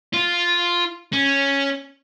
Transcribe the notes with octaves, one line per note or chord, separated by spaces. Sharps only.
F4
C#4